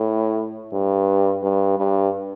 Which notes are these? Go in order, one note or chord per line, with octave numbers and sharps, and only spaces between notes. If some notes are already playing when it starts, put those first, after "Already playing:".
Already playing: A2
G2
G2
G2